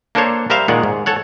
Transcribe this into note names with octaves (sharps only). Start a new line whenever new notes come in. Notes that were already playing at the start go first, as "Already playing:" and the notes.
A#3 D4 A4 C5 C#5
G3 A#4 C5 E5 F5
A#2 D#3 G#3 G#4 D5 F#5
G#2
A4 C#5 F#5